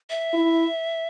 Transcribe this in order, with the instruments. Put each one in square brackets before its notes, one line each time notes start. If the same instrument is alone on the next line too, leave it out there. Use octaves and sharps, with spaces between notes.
[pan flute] E5
[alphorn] E4